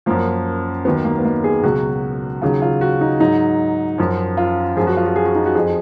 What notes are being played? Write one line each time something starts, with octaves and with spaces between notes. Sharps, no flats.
F#2 F3 A#3
D#2 D#3 F#3 B3
A#3
B3
A#3
G#4
C#2 B2 F#3 F#4
D#2 C#3 F#3 F4
F4
F#4
D#4
G#2 F#3 D#4
F#2 F3
F4
F#2 F3 G#4
F#4
F4
F#4
G#4
F#4
D#4
F#4
F2 F3 G#4